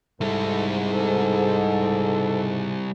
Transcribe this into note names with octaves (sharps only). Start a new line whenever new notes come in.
G#2 G3 E4 A4
A4